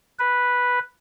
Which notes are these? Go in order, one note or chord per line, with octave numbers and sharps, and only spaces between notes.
B4